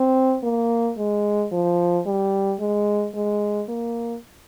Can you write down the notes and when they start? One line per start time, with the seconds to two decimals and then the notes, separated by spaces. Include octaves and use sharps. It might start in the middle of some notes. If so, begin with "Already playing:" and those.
Already playing: C4
0.43 A#3
0.98 G#3
1.52 F3
2.06 G3
2.60 G#3
3.15 G#3
3.69 A#3